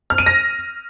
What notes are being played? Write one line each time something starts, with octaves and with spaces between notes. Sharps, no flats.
F6
D#7
A#6